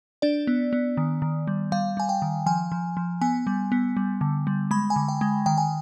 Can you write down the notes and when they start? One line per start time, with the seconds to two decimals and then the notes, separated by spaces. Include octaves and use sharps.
0.22 D4 D5
0.47 B3
0.73 B3
0.97 D#3
1.22 D#3
1.47 G3
1.72 G3 F5
1.97 G3 G#5
2.09 G5
2.22 D#3
2.46 F3 G#5
2.72 F3
2.97 F3
3.21 B3 G#5
3.47 G3
3.72 B3
3.97 G3
4.21 D3
4.47 G3
4.71 G#3 B5
4.90 G#5
4.96 D3
5.08 G5
5.21 G#3
5.46 D#3 G5
5.58 G#5